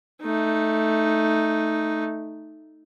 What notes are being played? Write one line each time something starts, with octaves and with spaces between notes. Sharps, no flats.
A3 D#4